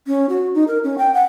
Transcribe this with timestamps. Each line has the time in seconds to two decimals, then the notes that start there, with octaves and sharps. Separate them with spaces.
0.07 C#4
0.29 F#4
0.54 D#4
0.68 A#4
0.84 C#4
0.98 G5
1.14 F#5